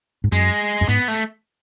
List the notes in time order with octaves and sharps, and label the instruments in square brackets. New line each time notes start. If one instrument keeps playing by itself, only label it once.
[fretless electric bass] G#2
[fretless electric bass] F#2 [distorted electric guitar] G#3
[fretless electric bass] F#2
[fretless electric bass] G#2 [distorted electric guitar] B3
[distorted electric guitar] A3